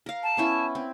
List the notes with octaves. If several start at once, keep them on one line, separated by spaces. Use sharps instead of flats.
A#4 F5
A5
B3 C#4 E4
C4